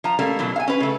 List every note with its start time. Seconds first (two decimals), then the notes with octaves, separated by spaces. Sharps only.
0.04 F3 A#5
0.19 G3 A3 A#3 C#4
0.39 B2 E3 F#3
0.56 F5 G#5
0.68 C#4 B4
0.80 C#3 A3